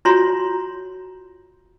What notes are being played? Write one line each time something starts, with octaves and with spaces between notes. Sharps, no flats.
F4 F#4 C#5 A#5 C6